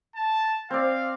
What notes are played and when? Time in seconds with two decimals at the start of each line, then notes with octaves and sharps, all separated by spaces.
0.15 A5
0.70 C4 D5 F5